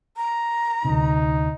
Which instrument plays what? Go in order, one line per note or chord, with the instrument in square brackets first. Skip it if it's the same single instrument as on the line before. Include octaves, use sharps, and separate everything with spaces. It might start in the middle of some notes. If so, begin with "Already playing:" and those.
[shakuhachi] A#5
[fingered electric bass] D2 C3 [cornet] D#4